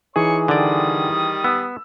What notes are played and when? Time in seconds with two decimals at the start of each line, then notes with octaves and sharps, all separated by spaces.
0.16 E3 D#4 G#4 C#5 C#6
0.48 D3 D#3 G3 D5 D#6
1.44 B3 E6